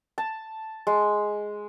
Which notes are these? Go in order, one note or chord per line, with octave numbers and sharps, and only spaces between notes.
A5
G#3